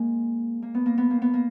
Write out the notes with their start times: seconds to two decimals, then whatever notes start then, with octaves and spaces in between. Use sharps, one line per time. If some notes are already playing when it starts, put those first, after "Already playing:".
Already playing: G#3 A#3
0.62 A#3
0.74 B3
0.86 A#3
0.98 B3
1.10 A#3
1.22 B3
1.34 A#3